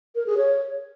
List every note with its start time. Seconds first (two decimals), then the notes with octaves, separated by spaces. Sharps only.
0.15 A#4
0.26 G#4
0.37 C#5